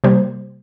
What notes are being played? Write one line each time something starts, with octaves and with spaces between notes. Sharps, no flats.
C3 G3 A#3 C5